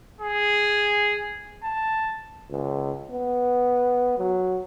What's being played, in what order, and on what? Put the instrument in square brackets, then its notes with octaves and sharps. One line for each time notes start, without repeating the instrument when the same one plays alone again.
[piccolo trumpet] G#4
A5
[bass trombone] C#2
B3
F#3